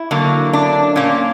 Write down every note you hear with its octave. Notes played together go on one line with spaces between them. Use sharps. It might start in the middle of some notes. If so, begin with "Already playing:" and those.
Already playing: E4
D3 F#3 A#3
D4
A#2 A#3 C#4